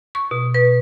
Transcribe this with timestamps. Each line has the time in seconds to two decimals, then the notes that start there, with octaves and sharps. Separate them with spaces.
0.15 C#6
0.31 B2
0.54 B4